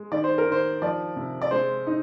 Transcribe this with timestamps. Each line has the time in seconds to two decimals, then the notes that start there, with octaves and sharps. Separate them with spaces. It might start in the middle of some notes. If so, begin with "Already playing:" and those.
Already playing: G#3
0.12 D#3 D5
0.24 C5
0.38 A#4
0.46 D#3
0.52 C5
0.82 F3 D5
1.16 C3
1.42 D5
1.51 G#3 C5
1.87 D#4